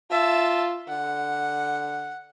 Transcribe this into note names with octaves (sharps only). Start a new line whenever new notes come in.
F4 E5 A5
D3 F#5